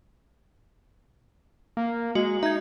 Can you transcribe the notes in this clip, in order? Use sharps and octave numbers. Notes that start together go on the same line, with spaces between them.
A#3
G#3 F#4
D#4 E5 G#6